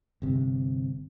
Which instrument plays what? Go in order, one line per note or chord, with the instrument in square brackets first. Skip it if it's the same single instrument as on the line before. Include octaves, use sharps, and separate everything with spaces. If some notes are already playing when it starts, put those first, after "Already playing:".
[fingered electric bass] G1 C3